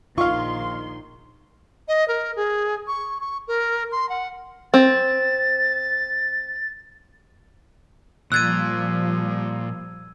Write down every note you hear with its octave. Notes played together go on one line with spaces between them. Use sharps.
A#1 D#3 F4 F5 C6 C#6
D#5
A#4
G#4
C#6
C#6
A#4
C6
F#5
C4 A6
A#2 F3 G3 E6 F#6 G#6 A6 D#7